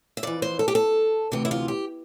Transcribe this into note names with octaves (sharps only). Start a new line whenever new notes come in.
E5
F2 E3 D5
C5
A4
G4
A4
D2 C3 E3 G4
E4
F4
G4